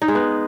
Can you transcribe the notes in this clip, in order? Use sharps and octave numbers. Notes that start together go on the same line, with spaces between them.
D#4
G#3
B3